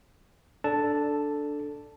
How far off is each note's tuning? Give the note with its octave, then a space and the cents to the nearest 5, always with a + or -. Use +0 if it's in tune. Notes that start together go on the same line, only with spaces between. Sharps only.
D4 +0 A4 +0 A5 +0